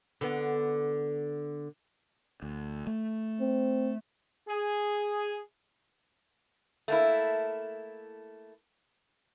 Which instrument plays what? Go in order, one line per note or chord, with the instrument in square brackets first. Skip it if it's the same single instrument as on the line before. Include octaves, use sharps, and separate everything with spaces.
[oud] D3 B3
[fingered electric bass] D2
A3
[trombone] C4
[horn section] G#4
[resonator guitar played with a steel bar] A3 A#3 E4